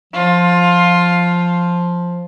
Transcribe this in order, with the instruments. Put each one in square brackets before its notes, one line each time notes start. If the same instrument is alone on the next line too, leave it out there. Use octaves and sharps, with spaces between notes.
[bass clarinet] F3 [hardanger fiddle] F4